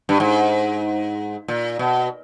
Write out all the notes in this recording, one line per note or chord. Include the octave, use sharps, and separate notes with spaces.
G2
G#2
A#2
B2